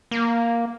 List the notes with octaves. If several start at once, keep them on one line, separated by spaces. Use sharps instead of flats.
A#3